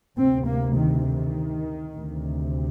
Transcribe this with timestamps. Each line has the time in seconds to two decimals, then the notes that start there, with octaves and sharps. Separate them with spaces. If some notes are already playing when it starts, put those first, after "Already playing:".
0.18 D2 C3 C4
0.47 A#3
0.77 D#3
1.06 D#3
1.95 D2 C3